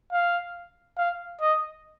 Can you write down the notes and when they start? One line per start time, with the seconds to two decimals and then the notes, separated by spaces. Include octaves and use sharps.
0.12 F5
0.97 F5
1.41 D#5